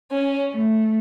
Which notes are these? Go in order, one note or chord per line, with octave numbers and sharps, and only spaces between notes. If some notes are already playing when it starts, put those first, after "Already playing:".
C#4
A3